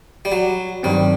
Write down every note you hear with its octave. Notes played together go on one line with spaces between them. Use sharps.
G3
F#3
G2 D#3 F#3 G3 C4